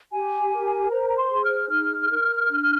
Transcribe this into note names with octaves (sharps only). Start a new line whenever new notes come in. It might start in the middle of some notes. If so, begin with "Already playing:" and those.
G4 G#5
A#4
C5 A#5
A#5
C6
G#4
F6
D#4 F6
A#4
D4